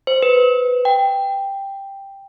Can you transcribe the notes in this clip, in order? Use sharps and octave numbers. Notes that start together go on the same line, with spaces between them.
C5
B4
G5